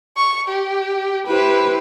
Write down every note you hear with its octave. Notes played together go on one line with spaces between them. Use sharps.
C#6
G4
E4 G4 B4 C5